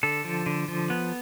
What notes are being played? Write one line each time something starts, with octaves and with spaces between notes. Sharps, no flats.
D3 A4
F3
D3
F3
B3